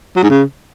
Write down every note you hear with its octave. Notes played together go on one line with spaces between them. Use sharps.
F#3
G#2
C#3